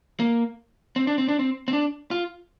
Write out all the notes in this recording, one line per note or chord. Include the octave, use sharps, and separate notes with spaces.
A#3
C4
D4
C4
D4
C4
C4
D4
F4